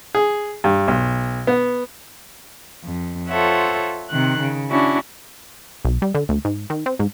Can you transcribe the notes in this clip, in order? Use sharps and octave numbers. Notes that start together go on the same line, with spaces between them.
G#4
G2
B1
B3
F2
F4 A4 C5 C#5 E5 F#5
C3 D#3 F#6
C#3
C#4 D4 E4 F#4
B1
G3
D3
D2
G#2
D#3
C4
G#2